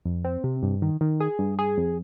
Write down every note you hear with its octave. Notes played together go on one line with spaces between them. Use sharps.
F2
C4
C3
G2
D#3
D#3
G#4
G2
G#4
F2